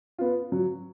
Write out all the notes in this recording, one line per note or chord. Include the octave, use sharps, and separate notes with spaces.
B3 F4
F#3